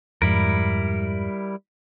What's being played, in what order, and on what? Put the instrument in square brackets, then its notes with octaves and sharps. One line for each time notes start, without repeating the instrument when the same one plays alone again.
[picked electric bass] F2 G#2 [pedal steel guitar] G3 E4 A#4